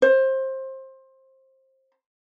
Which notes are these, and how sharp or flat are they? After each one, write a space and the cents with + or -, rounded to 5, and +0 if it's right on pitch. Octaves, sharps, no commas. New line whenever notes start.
C5 +20